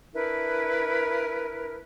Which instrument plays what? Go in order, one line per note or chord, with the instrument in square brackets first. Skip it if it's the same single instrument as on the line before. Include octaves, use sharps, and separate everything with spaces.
[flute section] D4 E4 A#4 B4